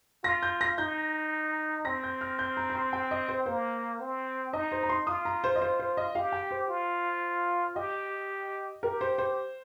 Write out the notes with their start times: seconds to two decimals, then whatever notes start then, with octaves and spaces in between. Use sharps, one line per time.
0.24 F4 A#6
0.43 G6
0.61 A#6
0.78 D#4 G6
1.85 C4 A#6
2.04 G6
2.21 F6
2.39 G6
2.57 A#5
2.70 A#5
2.75 C6
2.93 G5
3.11 D#5
3.29 C5
3.46 A#3 C5
4.00 C4
4.53 D#4 D#5
4.72 C5
4.83 A#5
4.89 C6
5.07 F4 D#6
5.25 A#5
5.44 C5
5.56 D#5
5.61 C5
5.80 C5
5.97 D#5
6.15 G4 F5
6.32 G5
6.51 C5
6.69 F4
7.76 G4 D#5
8.83 G4 A#4
9.01 C5
9.18 C5